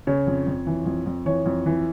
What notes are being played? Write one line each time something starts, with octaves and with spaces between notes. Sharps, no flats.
C#3 C#5
F2
F2
E3
F2
F2
E3 C#5
F2
E3